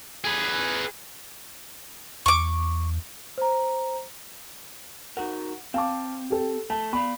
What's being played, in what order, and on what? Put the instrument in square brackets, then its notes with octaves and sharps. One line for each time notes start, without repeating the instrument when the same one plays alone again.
[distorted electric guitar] G#4 B4
[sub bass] E2 [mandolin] C#6 D6
[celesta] C5 A#5
[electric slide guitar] D#4 F#4 A#4 [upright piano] F#5
[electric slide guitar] C4 [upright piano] F5 A5 D6
[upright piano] G4 A4
[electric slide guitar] A3 [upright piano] A5
[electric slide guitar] B3 D5 F5 [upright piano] B5